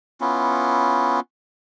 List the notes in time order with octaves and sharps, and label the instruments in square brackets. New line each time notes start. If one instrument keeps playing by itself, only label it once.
[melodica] B3 C#4 E4 F4